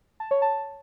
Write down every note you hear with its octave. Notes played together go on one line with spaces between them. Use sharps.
A5
C#5
A5